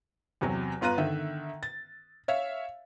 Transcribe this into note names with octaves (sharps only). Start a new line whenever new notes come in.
E2 C3 F#3
G1 B3 F4 A#5 F#6 D#7
D3 D#3 E5
A6
C#5 E5 F5